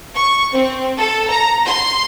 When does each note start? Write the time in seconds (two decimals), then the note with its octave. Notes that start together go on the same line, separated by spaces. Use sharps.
0.15 C#6
0.54 C4
0.98 A4
1.30 A#5
1.65 C6